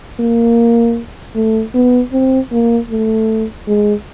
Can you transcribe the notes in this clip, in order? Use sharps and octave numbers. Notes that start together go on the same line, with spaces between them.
A#3
A3
B3
C4
A#3
A3
G#3